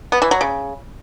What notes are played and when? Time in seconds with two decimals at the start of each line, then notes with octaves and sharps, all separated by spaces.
0.12 B3
0.22 E3
0.31 F#3
0.41 C#3